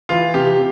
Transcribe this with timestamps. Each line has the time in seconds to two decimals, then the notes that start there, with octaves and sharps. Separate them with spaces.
0.09 E3 F4
0.34 C3 G4